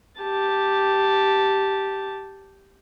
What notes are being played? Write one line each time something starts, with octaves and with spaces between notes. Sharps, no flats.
G4 A5